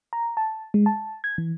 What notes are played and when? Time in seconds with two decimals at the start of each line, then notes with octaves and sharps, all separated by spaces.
0.13 A#5
0.37 A5
0.74 G#3
0.86 A5
1.24 G#6
1.38 E3